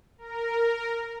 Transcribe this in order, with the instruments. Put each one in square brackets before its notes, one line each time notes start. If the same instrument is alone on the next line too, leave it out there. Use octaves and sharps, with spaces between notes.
[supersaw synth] A#4